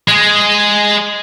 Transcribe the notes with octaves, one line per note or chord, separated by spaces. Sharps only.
G#3 G#4